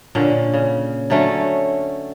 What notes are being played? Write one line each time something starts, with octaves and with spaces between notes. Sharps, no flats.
A#2 D3 C#4
C#3
D3 F#3 A3 C#4